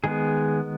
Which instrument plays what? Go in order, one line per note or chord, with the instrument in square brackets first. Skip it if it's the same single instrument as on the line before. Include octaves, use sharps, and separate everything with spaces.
[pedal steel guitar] D#3 G#3 B3 G#4